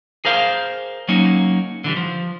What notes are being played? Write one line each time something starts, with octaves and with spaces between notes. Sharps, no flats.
G#4 A#4 C5 F5
F#3 A#3 C#4 D#4
D3 E3 G3
F3